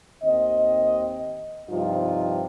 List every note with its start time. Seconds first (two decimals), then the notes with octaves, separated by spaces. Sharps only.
0.24 D#2 C4 D#5
1.70 G2 C3 F3 D#4 F4